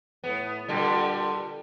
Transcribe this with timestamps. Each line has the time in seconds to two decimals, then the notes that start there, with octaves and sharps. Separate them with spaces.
0.24 A2 B3
0.68 A#2 D3 G3 A4